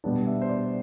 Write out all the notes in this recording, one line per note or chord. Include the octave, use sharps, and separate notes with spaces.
B2 G3 B3 D4
E5
C5
D5